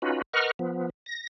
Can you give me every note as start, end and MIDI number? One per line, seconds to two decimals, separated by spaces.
0.02 0.22 61
0.02 0.22 63
0.02 0.22 65
0.02 0.22 66
0.02 0.22 71
0.33 0.51 70
0.33 0.51 71
0.33 0.51 75
0.33 0.51 78
0.33 0.51 85
0.33 0.51 89
0.59 0.90 53
0.59 0.90 59
1.06 1.27 94